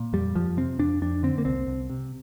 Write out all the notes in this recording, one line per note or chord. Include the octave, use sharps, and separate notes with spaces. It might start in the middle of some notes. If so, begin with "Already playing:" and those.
Already playing: A#2
F2 G3
F2 F3
C3 C4
F2 D4
F2 D4
D3 C4
A#3
C2 C4
C2
C3